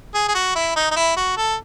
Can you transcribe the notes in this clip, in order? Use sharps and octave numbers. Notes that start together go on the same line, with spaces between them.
G#4
G#4
F#4
E4
D#4
D#4
E4
F#4
A4